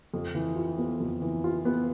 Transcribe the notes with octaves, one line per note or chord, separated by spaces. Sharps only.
F2
E3
F4
B3
F2
E3
F4
B3